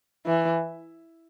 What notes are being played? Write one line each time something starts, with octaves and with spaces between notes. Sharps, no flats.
E3